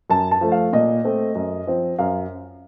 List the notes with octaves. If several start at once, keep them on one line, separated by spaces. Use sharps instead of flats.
F#2 A5
A5
F3 A3
F5
A#2 D#5
A3 C4
F#2
F3 C4
F#2 F5